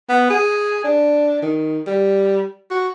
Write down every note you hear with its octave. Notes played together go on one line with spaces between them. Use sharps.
B3
G#4
D4
D#3
G3
F#4